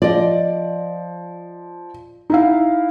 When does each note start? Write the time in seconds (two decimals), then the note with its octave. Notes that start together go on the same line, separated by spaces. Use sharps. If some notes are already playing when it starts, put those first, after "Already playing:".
0.02 F3 D5 D#5
2.30 D#4 E4 F5